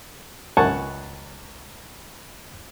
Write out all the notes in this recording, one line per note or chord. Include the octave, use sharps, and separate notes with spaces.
C#2 F#5 G#5 A5 C#6